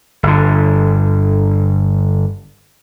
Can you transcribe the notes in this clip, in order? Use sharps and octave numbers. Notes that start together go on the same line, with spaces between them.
G1 D3